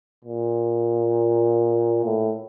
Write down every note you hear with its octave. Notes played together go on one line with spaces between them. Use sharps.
A#2
A2